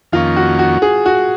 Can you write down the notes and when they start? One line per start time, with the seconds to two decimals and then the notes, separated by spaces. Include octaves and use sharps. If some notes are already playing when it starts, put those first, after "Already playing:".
0.12 F2 D#3 A#3 C#4 F4
0.36 F#4
0.59 F#4
0.82 G#4
1.06 F#4